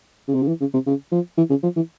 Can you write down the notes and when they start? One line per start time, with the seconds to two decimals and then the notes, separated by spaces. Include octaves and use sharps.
0.28 C#3
0.35 C3
0.42 C#3
0.48 E3
0.61 C#3
0.74 C3
0.87 C#3
1.12 F3
1.38 E3
1.50 C#3
1.63 F3
1.76 E3